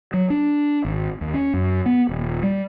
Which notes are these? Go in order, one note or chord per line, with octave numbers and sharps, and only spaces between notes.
F#3
D4
G#1
D#2
C#4
F#2
B3
D#1
G3